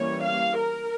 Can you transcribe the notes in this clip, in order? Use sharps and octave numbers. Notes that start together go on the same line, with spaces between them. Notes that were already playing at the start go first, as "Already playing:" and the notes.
Already playing: E3 G3 A#3 C#4 C#5
F5
A#4